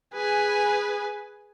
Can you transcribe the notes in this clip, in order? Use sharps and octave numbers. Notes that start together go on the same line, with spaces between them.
G#4 B4 G#5